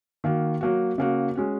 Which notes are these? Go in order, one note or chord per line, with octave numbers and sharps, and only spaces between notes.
D#3 A#3 F#4
F#3 A#3 F#4
C#3 A#3 F#4
G#3 C#4 F#4